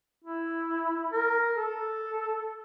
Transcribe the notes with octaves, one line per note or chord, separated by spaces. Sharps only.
E4
A#4
A4